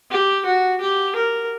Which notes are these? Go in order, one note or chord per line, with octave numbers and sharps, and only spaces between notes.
G4
F#4
G4
A#4